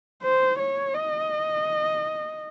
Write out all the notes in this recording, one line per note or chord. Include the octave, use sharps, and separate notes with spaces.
C5
C#5
D#5